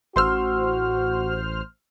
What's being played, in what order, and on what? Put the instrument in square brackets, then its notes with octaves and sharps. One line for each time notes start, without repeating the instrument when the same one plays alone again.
[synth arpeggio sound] A1 C5 F6 [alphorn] F#4 [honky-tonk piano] C6 E6